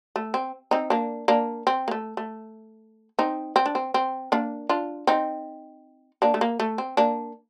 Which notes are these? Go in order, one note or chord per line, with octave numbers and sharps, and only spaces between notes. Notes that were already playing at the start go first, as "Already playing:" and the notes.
A3
C4
C4 D#4
A#3 D4
A#3 D4
C4
A#3
A3
A3
C4 D#4
C4
D4
C4
C4
A#3 D4
D4 F4
C4 D#4
A#3 D4
A3
A#3
A3
C4
A#3 D4